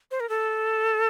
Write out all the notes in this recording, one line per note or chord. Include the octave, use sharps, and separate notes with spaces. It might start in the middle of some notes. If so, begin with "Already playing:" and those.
C5
A#4
A4